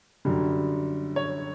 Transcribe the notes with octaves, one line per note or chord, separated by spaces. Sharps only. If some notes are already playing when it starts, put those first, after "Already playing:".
F#2 D3 G3
C#5